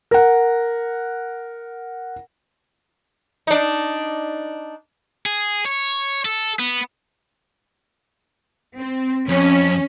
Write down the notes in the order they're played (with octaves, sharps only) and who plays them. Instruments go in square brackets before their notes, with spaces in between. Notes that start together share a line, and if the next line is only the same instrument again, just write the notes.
[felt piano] A#4 F#5
[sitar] D4 D#4
[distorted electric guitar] G#4
C#5
A4
B3
[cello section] C4
[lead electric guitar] F2 [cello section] C#4